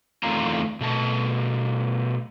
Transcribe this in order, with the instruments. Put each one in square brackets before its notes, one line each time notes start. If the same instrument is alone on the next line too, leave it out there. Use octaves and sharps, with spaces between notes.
[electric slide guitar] E2 D#3 A3 C4 F4 A#5
B2 A3 A5